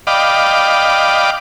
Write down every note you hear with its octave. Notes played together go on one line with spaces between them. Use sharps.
D5 D#5 F5 G5 B5 D6